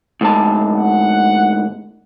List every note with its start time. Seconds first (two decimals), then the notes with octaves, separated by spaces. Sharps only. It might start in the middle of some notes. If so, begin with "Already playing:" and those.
0.21 D2 G#2 A5
0.75 F#5